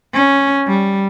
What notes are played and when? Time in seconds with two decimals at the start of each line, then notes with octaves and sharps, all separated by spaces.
0.14 C#4
0.67 G3